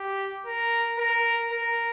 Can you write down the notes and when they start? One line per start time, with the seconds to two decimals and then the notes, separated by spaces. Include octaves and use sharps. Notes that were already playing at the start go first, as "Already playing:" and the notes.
Already playing: G4
0.46 A#4
0.99 A#4
1.52 A#4